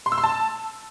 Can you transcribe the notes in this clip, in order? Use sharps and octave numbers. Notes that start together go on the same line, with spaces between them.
C6
E6
C6
A5